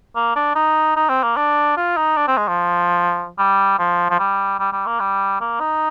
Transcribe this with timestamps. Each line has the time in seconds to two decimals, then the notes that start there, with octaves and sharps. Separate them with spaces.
0.16 A#3
0.36 D4
0.56 D#4
0.96 D#4
1.09 C4
1.23 A#3
1.37 D4
1.77 F4
1.97 D#4
2.17 D4
2.28 C4
2.37 G#3
2.48 F3
3.39 G3
3.79 F3
4.10 F3
4.19 G3
4.59 G3
4.73 G3
4.86 A#3
5.00 G3
5.41 A#3
5.60 D#4